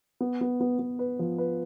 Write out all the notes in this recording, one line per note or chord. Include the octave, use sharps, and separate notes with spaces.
B3
B3
B3
B3
B4
F3
B4